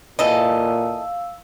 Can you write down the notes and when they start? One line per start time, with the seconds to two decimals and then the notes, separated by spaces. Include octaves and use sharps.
0.19 A#2 E3 A4 D#5 F5 E6